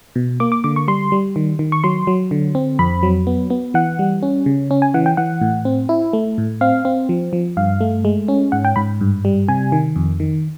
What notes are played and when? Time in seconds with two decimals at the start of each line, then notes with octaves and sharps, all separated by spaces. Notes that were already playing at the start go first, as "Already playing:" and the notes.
0.16 B2
0.40 A#3 D6
0.52 D6
0.64 D3 D6
0.76 C#6
0.88 G3 C6
1.12 G3
1.36 D#3
1.59 D#3
1.72 C#6
1.84 F#3 C6
2.07 F#3
2.31 D3
2.55 C4
2.79 F2 B5
3.03 F#3
3.27 B3
3.50 B3
3.74 E3 F#5
3.99 G3
4.23 C#4
4.46 C#3
4.71 C#4
4.82 G#5
4.94 E3 F#5
5.06 G5
5.17 E3 F#5
5.41 A2
5.65 C4
5.89 E4
6.13 A3
6.38 A2
6.61 C4 F5
6.85 C4
7.09 F3
7.33 F3
7.57 G2 F5
7.81 A3
8.05 G#3
8.28 C#4
8.52 G#2 F#5
8.65 G5
8.76 G#2 B5
9.01 G2
9.25 G3
9.48 C3 G#5
9.72 D#3
9.96 F2
10.20 D#3